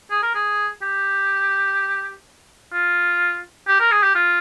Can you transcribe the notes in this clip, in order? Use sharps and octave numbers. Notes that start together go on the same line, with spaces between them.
G#4
A#4
G#4
G4
F4
G4
A#4
G#4
G4
F4